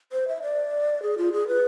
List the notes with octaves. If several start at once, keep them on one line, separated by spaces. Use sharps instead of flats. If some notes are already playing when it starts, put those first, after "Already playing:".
C5
E5
D5
G#4
F4
G#4
B4